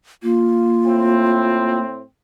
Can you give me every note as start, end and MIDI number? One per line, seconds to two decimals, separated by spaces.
0.23 1.83 58
0.23 1.78 65
0.85 2.00 45
0.85 2.00 60